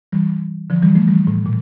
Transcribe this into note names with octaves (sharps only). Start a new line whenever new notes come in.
E3 G3
D3 F3
E3 G3
F3 A3
E3 G3
A2
A#2